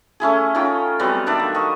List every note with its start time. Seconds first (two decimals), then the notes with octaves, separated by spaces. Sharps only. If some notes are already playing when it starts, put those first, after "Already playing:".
0.20 A3 C#4 E4 G#4
0.55 C#4 D#4 F4 G5
0.99 F#3 G3 B3 C4
1.26 D#3 D4 D5 E5
1.39 A#3
1.54 D#5 C#6